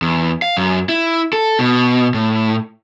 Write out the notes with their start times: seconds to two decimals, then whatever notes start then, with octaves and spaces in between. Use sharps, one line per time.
0.02 E2
0.42 F5
0.57 F#2
0.89 E4
1.33 A4
1.59 B2
2.14 A2